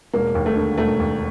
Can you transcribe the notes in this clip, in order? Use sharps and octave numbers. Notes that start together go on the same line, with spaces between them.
E1 A#3
D#2
A3
D3
E1 A3
D#2